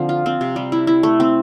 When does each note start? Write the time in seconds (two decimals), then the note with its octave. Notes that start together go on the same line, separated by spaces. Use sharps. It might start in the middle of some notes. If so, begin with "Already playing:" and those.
Already playing: D3 F3 C4
0.09 F4
0.26 C4
0.41 C3
0.56 G3
0.72 E4
0.87 E4
1.03 A3
1.20 C4